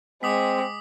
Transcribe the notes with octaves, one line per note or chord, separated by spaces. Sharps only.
G#3 C4 D6 D#6 B6